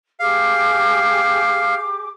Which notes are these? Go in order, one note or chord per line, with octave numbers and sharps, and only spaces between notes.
G4 G#4 F5 D6